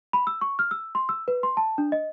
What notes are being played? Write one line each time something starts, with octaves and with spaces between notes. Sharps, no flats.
B5
E6
C#6
F6
E6
C6
E6
B4
C6
A5
D4
D#5